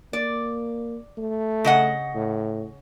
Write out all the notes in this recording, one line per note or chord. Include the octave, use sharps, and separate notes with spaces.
A#3 D5
A3
C#3 D#5 F#5
A2